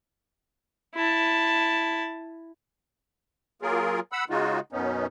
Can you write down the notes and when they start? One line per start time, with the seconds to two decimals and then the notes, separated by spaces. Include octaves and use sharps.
0.95 E4 A5
3.62 F#3 A#3 F4 G#4 A#4
4.12 F#5 B5 E6
4.30 C#3 G#3 D#4 F4 F#4
4.72 F#2 B2 B3 C#4 D#4